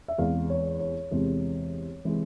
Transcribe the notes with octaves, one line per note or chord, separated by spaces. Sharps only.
E5
E2 C3 E3 G#3 F5
C#5
C#5
E2 C3 E3 G#3
C3 E3 G#3